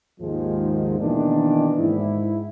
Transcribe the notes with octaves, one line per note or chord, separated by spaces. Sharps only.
D#2 G#2 D#3 F3 G#3
B2 D#3 E3 A#3 D4
G#2 E4